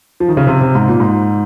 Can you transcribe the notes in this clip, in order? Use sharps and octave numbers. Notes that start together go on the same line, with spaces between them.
F3
D#3
C#3
C3
C3
G#2
A#2
G#2